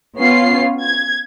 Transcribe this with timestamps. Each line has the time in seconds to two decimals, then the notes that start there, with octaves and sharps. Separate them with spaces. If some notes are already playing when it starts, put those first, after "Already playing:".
0.19 B3 C#4 F4 C7
0.81 G#6